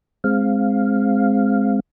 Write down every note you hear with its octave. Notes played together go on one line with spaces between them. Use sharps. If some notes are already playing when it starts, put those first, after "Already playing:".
G#3 C4 F5